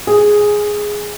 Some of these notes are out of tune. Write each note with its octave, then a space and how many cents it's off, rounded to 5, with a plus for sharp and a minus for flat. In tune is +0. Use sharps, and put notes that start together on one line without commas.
G#4 +0 G#5 -30